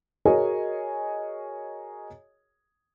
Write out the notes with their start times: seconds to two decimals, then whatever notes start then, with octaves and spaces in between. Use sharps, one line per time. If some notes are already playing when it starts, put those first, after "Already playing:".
0.25 F#4 G#4 A#4 C#5 D#5 G#5